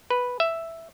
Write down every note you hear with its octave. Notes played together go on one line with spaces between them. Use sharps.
B4
E5